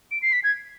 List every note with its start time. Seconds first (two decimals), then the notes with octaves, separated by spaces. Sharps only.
0.11 D7
0.22 C7
0.33 B6
0.44 G#6